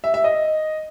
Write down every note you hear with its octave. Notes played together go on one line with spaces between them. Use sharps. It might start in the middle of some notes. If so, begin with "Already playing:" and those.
E5
E5
D#5